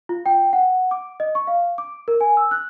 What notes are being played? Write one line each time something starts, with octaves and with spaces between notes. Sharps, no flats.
F4
G5
F#5
D6
D#5
C#6
F5
D6
A#4
G#5
E6
F#6